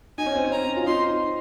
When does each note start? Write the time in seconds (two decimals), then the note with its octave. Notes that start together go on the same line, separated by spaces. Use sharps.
0.18 D#4 G#5
0.26 C#4
0.35 C4
0.45 C#4
0.52 A#5
0.76 F4
0.86 C4 D#4 C6